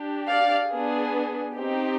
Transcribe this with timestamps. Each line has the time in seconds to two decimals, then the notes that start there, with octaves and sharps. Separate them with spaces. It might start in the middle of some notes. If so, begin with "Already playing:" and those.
Already playing: D4 G4
0.29 D5 F5
0.71 B3 D4 G#4
1.56 C4 D#4 G4